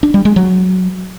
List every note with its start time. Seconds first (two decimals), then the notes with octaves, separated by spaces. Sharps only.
0.03 D4
0.14 G3
0.25 G#3
0.36 F#3